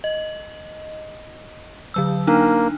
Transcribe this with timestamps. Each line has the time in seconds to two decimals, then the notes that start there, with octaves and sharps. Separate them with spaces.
0.04 D#5
1.94 D3 F#3 E6
2.27 A#3 D4 D#4